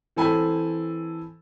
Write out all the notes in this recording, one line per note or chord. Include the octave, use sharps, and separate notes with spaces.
E3 C4 A4 G#5 B5